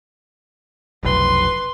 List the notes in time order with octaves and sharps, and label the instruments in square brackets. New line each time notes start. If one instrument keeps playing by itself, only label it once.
[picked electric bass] F1 B1 [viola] B4 C6